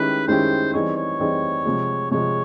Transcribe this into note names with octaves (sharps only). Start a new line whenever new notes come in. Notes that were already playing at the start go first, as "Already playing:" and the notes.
Already playing: D#3 G#3 C#4 E4 G4 B4
D#3 G#3 C#4 E4 G4 C5
E3 G3 C4 D#4 G#4 C#5
C#5
E3 G3 C4 D#4 G#4
C3 F3 G#3
C3 F3 G#3 C#5